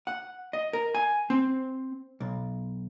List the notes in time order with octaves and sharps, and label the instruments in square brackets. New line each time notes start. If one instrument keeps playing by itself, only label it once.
[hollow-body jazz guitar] F#5
D#5
A#4
G#5
C4
B1